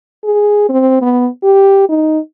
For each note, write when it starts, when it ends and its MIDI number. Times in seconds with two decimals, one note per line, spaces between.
0.24 0.66 68
0.69 1.00 60
1.02 1.27 59
1.43 1.87 67
1.89 2.19 63